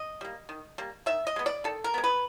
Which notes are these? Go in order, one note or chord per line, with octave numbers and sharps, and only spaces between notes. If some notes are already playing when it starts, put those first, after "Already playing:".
Already playing: D#5
G3 A#3
D#3
G3 A#3
D#3 E5
D#5
G#3 B3
D5
D#3 A4
A#4
G#3 B3
B4